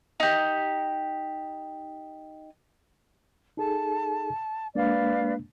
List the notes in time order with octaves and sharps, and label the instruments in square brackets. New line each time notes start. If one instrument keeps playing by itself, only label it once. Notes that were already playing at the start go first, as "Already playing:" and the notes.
[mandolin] D#4 G4
[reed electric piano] D#4 G#4 A4 [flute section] A5
[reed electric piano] G#3 A#3 D4 [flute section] B4 D5 F5